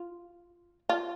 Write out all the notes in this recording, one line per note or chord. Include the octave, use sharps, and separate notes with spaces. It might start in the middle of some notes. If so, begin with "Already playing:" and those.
Already playing: F4
F4